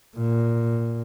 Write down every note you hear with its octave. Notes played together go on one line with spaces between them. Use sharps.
A#2